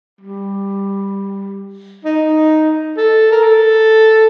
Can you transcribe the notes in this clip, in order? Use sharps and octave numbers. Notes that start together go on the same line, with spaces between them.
G3
D#4
A4
A#4
A4